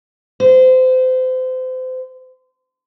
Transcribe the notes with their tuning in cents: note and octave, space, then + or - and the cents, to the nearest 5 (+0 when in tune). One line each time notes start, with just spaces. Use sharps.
C5 -30